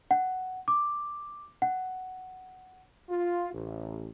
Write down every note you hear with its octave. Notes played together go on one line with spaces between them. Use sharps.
F#5
D6
F#5
F4
A1